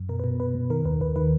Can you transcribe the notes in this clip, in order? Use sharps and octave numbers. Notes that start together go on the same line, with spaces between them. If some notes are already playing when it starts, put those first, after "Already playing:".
Already playing: F#2
B2 A#4
B4
B2
B2 B4
B2
D#3 A#4
D#2 B4
D#2 B4
D#3 B4